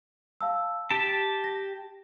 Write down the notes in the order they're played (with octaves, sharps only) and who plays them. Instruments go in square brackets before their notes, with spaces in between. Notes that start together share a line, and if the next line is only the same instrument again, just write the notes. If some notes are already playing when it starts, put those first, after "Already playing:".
[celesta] F5 A5 E6
[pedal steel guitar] G4 A5 [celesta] D7
[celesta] A#6